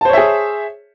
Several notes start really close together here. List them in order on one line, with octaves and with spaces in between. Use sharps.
A5 C5 C#5 E5 G#4